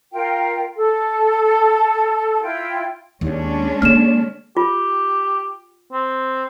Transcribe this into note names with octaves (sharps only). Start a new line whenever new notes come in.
F4 A#4 G5
A4
E4 F4 G5
D#2 G#3 C#4 D4
D3 A#3 F6 E7
F4 G4
C4